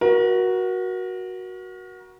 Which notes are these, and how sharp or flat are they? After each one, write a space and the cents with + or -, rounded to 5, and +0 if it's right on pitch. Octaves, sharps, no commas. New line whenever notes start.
F#4 +0 A#4 +35